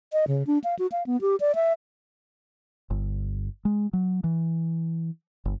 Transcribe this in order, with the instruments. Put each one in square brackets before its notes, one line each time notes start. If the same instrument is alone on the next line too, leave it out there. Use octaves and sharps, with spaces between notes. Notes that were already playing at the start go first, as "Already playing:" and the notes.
[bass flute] D#5
C#3
D4
F5
F#4
F5
B3
G4
D5
E5
[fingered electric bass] G1
G#3
F#3
E3
G1